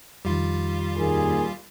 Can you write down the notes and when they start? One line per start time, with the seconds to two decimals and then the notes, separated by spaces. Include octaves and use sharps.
0.25 F2 D#3 G3 F4
0.96 D#2 A#2 G#4